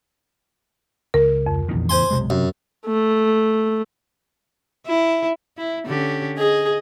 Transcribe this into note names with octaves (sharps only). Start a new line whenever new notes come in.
C#2 A#4
F2
A#1 E2 D#3
E2 A2 C#3 C5 G#5 C6
B1 C3 G#3
F#2 C3
A3
E4
E4
D3 C#4 G4
G#4 D#5